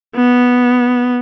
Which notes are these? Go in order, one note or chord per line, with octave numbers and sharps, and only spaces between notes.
B3